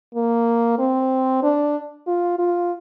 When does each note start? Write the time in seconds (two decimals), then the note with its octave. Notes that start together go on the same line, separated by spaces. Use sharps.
0.15 A#3
0.79 C4
1.43 D4
2.07 F4
2.39 F4